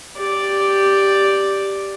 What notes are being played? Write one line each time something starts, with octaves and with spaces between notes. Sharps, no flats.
G4 D5